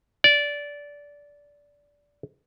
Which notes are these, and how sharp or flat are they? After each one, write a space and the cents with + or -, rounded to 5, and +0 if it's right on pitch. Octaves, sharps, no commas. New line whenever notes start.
D5 -15